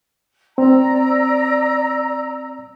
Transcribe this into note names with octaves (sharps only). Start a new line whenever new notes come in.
C4 D5 A#5 E6